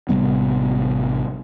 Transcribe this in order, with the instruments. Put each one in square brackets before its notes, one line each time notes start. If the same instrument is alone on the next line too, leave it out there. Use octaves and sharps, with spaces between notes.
[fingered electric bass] A1 C3 G3 B3